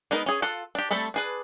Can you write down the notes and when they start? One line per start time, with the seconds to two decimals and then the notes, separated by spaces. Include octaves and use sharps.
0.11 G#3 B3 D#4 A#4
0.26 C#4 G#4
0.42 F4 A4 F#5
0.75 D4 G4
0.91 G3 A3 C4 A4 B5
1.14 D4 G#4 B4